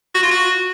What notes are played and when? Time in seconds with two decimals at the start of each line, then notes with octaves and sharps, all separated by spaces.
0.15 F#4
0.23 F4
0.31 F#4